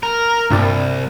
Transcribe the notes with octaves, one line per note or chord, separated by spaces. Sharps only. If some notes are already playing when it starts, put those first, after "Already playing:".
A#4
C2 G2 A#2 A6